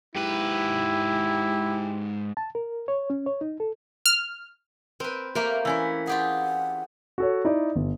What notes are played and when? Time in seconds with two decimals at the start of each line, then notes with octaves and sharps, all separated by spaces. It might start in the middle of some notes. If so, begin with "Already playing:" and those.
0.16 G#2 E4 G4 B4
2.37 A5
2.55 A#4
2.88 C#5
3.10 C#4
3.26 C#5
3.41 D#4
3.60 A4
4.06 F6
5.00 C4 A#4 B4
5.35 A3 A#3 G4 A#4
5.65 E3 C#4 E4
6.07 F4 G4 G#4 F#5
7.18 F#4 A4 C#5
7.45 D#4 E4 D5
7.76 G1